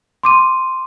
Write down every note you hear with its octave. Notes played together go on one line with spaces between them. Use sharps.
C6 D6 D#7